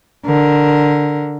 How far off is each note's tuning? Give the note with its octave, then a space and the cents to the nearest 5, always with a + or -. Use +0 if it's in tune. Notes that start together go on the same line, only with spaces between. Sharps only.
D3 +0 A#4 +0